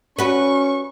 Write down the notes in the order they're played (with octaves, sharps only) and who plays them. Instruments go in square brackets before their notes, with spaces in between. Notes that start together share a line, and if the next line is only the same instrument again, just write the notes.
[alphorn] C#4 [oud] F#4 B4 [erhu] C#6